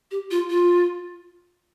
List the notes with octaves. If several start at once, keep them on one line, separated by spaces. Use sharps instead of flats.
G4
F4
F4